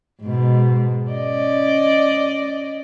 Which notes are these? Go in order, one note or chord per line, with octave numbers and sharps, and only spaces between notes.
G#2 B2
C#4 D5 D#5